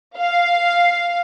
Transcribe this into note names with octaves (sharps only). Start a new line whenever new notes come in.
F5